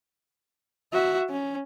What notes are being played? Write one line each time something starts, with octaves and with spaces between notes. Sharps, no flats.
F#4 E5
C#4